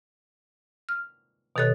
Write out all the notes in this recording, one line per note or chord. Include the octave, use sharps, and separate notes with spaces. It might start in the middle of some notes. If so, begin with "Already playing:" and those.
F6
B2 D#3 G4 A4 C#5 F#6